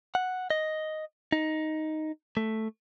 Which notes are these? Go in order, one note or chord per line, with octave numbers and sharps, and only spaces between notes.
F#5
D#5
D#4
A3